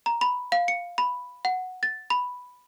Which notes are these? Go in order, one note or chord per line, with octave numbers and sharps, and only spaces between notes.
A#5
B5
F5
C#7
B5
F#5
A6
B5